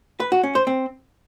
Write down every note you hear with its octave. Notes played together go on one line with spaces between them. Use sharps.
B4
F#4
C#4
C5
C4